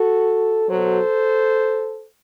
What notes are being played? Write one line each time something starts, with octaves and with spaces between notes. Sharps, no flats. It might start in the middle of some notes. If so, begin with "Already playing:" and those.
Already playing: F#4 A4
B2 F#3 A4 C5